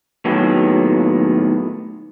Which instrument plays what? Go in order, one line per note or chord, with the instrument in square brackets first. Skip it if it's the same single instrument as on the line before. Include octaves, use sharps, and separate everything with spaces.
[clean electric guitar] A2 D#3 F#3 G#3 A#3 B3